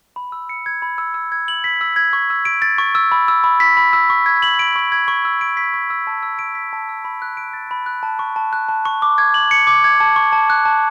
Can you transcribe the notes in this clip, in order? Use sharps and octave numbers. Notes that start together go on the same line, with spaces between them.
B5
E6
C#7
G#6
B5
E6
E6
G#6
F#7
B6
E6
G#6
C#6
E6
D7
A6
C#6
E6
B5
E6
B5
B6
B5
E6
C#6
G#6
F#7
D7
C#6
G#6
C#6
E6
D7
B6
C#6
E6
A5
E6
D7
B6
A5
E6
B5
F#6
D7
A6
B5
F#6
A5
C#6
A5
F#6
A5
C#6
D6
G#6
F#7
C#7
D6
G#6
A5
C#6
A5
F#6
A5